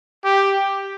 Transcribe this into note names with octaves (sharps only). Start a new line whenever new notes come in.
G4